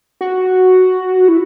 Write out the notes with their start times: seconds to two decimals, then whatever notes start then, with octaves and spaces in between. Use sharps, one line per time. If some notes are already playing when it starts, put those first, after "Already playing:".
0.21 F#4
1.28 E4